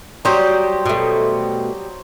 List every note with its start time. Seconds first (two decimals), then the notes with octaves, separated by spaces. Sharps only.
0.25 F#3 G3 G4 C5 D#6
0.86 B2 A3